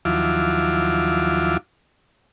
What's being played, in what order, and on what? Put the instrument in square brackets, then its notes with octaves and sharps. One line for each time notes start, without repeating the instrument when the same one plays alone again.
[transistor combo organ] D#2 F3 F#3 E4 F4 D6